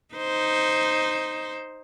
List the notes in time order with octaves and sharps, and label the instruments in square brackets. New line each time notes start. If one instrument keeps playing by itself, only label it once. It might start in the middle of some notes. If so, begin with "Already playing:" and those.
[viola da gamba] D#4 C5